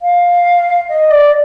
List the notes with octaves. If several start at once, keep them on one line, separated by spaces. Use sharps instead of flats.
F5
D#5
D5